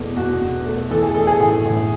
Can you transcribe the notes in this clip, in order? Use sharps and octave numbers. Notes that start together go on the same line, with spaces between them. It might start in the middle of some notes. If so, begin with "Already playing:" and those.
Already playing: E2 B2 A3
E2 F#4
B2
A3
E3 A4
G#4
A3 A4
G#4
A2
A2